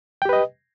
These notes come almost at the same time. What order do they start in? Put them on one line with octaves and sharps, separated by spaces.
G5 G4 B4 D#5